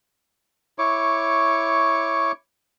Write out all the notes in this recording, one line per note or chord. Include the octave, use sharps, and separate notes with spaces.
E4 C#5 C#6 D6